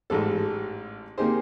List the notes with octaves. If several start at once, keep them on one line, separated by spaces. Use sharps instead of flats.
A1 G#2 A4
A#3 C4 D#4 G4 G#4 C5